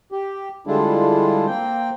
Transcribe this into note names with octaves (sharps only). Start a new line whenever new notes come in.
G4
D3 G3 G#3 D4 E4 F4
A#3 C4 G5